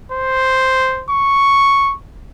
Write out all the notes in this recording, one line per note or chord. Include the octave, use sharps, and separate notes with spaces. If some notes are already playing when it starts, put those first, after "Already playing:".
C5
C#6